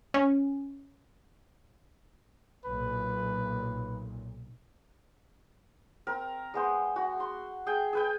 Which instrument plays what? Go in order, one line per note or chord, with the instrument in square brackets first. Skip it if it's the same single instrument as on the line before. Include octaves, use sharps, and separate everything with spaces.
[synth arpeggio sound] C#4
[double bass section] B1 A#2 [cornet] B4
[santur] C4 A#4
G#3 B3 C5
F#4
C6
G#4 G5
G#4 B4 G5